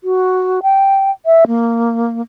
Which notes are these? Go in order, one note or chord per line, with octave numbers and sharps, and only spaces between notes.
F#4
G5
E5
A#3